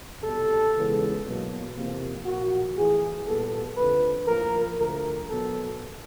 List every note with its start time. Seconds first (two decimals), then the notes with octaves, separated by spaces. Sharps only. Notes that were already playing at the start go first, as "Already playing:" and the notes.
0.24 C2 B2 G3 A4
0.75 C#2 C#3 E3 G#3 B3
1.26 B2 F#3 A#3
1.75 E2 C3 F3 A#3
2.25 A#2 F3 A#3 F#4
2.76 A2 E3 A3 G#4
3.26 A#2 G3 B3 A4
3.77 F2 D3 F3 A3 B4
4.27 A2 F3 A#3 A#4
4.78 D2 D3 F3 A3 A#4
5.28 B2 F#3 B3 A4